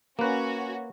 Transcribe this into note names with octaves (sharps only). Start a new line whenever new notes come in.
A#3 C#4 F#4 B4